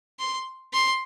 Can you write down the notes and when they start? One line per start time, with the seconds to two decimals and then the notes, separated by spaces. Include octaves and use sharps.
0.19 C6
0.74 C6